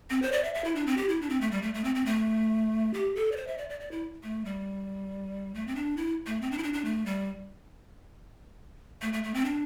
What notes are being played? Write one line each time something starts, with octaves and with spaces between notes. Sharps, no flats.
C4
C5
D5
E5
E5
E4
D4
C4
G4
E4
D4
C4
A3
G3
A3
A3
C4
C4
A3
G4
A4
D5
C5
E5
D5
D5
D5
E4
A3
G3
A3
C4
D4
E4
A3
C4
D4
E4
D4
D4
A3
G3
A3
A3
A3
C4
D4